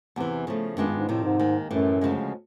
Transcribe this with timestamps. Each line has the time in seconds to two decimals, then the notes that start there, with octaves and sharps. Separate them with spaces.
0.16 E2 C3 E3
0.47 C#3 F3 A3
0.76 F#2 D#3 G#3 B3 D4 F4
0.87 G2
0.97 G#2
1.09 F2 A2 C3 D#3
1.24 G#2
1.39 D#2 D#3 G#3
1.70 F#2 A2 E3 G3
2.01 D2 C#3 F3 G#3